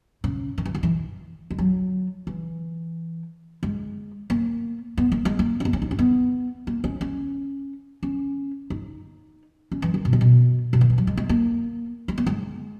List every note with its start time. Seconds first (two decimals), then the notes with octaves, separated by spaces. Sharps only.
0.24 C#3
0.58 D#3
0.66 E3
0.75 D#3
0.83 E3
1.51 G#3
1.59 F#3
2.27 E3
3.63 G#3
4.30 A#3
4.98 B3
5.12 A#3
5.25 G#3
5.39 A#3
5.60 C#4
5.65 B3
5.73 C#4
5.82 D#4
5.91 C#4
5.99 B3
6.67 A#3
6.84 C#4
7.01 C#4
8.03 C#4
8.70 D#4
9.72 C#4
9.82 E3
9.94 D#3
10.05 B2
10.13 C#3
10.21 B2
10.73 B2
10.81 D#3
10.90 E3
10.98 F#3
11.07 G#3
11.17 G#3
11.29 A#3
12.08 G#3
12.18 A#3
12.26 G#3